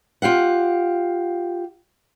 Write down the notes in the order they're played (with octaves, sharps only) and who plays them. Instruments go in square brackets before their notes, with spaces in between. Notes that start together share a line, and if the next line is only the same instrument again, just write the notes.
[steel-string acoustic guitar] F4 G4 F5 F#5